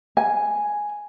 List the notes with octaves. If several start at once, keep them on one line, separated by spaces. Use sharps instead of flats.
G#5